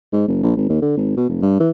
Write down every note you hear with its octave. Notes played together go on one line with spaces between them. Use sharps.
G#2
F#1
A#1
G#1
D#2
D3
G#1
B2
F1
G2
E3